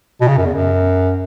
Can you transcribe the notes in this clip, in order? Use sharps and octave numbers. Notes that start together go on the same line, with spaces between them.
B2
C#3
F#2
E2
F#2